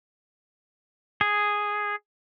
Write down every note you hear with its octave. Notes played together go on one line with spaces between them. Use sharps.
G#4